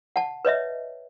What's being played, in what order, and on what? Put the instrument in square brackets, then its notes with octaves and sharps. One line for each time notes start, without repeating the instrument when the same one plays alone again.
[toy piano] F#5 A5
B4 C#5 D#5 E5